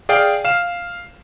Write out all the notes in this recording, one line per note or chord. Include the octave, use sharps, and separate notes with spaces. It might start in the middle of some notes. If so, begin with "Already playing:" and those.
G#4 D5 F5 G5
F5 E7